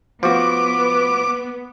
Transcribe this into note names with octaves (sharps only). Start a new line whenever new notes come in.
F3 B3 F#4 D6